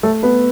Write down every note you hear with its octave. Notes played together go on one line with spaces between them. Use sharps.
A3 A4
B3 B4